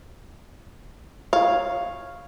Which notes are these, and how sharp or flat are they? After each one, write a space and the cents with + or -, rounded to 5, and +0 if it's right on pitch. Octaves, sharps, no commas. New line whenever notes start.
C#5 -5 F5 +0